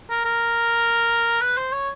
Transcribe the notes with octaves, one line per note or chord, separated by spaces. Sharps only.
A#4
A#4
B4
C5
C#5